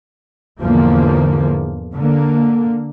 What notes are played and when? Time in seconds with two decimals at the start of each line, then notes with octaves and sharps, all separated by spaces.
0.61 E2 G#2 D3 F3 A#3
1.94 D3 A#3